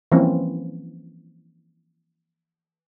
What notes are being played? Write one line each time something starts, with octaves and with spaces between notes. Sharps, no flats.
E3 F3 G3 A#3 C4 C#4